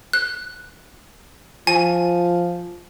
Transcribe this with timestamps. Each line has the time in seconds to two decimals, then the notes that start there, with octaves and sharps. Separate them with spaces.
0.13 F#6
1.67 F3 G#5